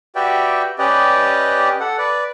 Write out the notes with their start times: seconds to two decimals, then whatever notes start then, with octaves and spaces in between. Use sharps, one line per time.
0.16 F#4 G4 B4 D5 E5 G5
0.79 C#4 G4 B4 D5 D#5
1.80 A4 F#5
1.98 B4 D5